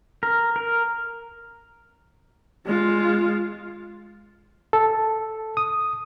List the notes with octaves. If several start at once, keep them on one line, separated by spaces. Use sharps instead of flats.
A#4
A#4
G#3 F4
A4
D#6